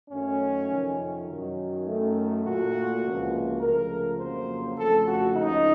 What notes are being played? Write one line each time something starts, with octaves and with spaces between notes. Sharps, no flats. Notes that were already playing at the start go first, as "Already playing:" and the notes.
F#2 D#3 F#3 A3 C#4
F2 C3 D#3
F#2 D#3 F#3
F#2 D#3 A3
A#2 A3 F#4
C#2 C3 F3 A#3
C#2 C#3 F3 A3 A#4
F2 C#3 F#3 A#3 C5
F2 C#3 A3 A4
F#4
C#2 C#3 F3 D#4